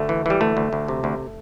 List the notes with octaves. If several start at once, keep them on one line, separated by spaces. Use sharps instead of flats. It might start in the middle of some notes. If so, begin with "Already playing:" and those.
Already playing: D2 A3
E3
E3 G3
D2 A3
D2
D2
C3
D2